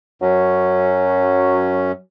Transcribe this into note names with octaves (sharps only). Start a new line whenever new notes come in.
F#2 F#3 C#4